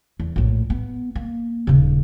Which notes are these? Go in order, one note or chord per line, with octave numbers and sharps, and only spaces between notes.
E2
A#1 A2
B3
A#3
D#1 C#3